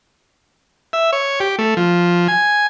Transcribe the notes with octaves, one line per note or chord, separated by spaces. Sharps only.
E5
C#5
G4
A3
F3
G#5